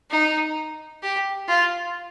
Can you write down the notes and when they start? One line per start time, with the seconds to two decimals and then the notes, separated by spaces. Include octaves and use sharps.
0.11 D#4
1.03 G4
1.49 F4